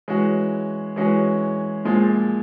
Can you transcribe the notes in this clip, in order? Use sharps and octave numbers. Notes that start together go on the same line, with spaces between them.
E3 G#3 C#4 F#4
E3 G#3 C#4 F#4
A#2 F3 G#3